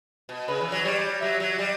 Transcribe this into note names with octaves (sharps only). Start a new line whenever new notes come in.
B2
C#3 B4
E3
F#3
G3 C#5
F#3 E5
F#3
G3